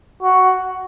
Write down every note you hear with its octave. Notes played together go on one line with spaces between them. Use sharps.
F#4